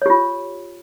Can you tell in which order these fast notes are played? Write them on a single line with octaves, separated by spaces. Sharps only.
C#5 G4 F4